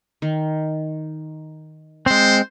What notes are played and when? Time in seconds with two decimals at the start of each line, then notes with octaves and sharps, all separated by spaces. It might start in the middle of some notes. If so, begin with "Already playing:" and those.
0.22 D#3
2.06 G#3 C4 C5